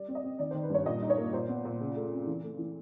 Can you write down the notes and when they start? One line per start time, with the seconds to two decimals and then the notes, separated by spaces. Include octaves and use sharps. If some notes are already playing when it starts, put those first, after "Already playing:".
Already playing: G3 D5
0.08 C4
0.15 D#5
0.24 C4
0.39 D#3 D5
0.51 C5
0.54 D#3
0.63 B4
0.70 G2 C#5
0.86 A#2 D#5
1.02 D#4
1.10 C#5
1.18 A#3
1.33 A#2 C5
1.49 B3
1.65 A#2
1.80 C#3
1.96 A3
2.12 C4
2.27 E3
2.44 A3
2.59 E3